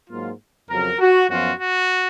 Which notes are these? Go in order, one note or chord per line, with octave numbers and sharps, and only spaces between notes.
G#2 F#3 A#3 F4
F2 C#3 F#3 A#4
F#4
F#2 F3 B3 F4 F#4
F#4